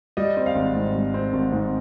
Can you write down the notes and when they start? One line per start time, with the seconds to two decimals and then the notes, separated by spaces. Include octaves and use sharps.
0.17 G3 D#5
0.37 C4
0.46 F5
0.56 G#1
0.75 G#2
0.95 G3
1.14 C4
1.33 G#1
1.52 G#2